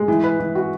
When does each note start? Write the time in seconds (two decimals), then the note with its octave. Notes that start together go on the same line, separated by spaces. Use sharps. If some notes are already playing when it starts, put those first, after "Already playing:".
Already playing: G#3
0.08 E3
0.24 B4
0.40 E3
0.55 F#4